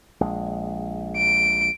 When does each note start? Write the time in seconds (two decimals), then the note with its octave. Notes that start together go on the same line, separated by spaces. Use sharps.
0.21 A#1 G#3
1.18 D7